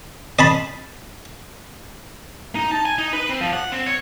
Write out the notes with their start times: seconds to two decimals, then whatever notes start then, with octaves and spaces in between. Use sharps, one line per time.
0.39 D#5 A5 B5
2.55 D#4
2.72 A5
2.85 G#5
2.98 D#4
3.13 B4
3.29 C4
3.41 F3
3.53 F#5
3.72 C4
3.86 C#5